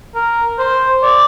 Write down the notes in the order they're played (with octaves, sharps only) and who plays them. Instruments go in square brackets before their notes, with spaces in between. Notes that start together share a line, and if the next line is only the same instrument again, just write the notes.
[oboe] A#4
C5
D5